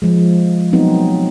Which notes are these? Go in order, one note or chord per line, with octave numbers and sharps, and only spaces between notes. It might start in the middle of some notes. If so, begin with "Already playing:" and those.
F3 G#3
F#3 B3 C4 D#4